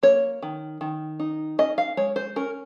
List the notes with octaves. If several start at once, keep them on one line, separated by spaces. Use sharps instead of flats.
A#3 C#5
D#3
D#3
D#4
C#4 D#5
F5
G#3 C#5
C5
C#4 A#4